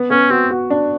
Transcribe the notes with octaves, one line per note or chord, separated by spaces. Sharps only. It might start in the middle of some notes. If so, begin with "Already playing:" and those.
Already playing: B3
B3 C#4
C4 F#4
F#4
D4